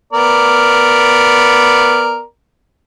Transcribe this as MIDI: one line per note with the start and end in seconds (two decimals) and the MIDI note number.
0.13 2.21 59
0.13 2.21 70
0.13 2.21 74